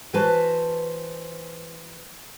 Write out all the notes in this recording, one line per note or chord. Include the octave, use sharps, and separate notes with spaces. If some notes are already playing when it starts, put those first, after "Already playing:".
E3 F#4 B4 C5 A5